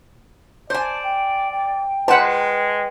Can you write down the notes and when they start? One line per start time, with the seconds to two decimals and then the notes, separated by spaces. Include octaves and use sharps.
0.70 C5 D5 G#5 A5
1.03 G5
1.52 G5
2.08 G#3 B4 C5 F#5 A5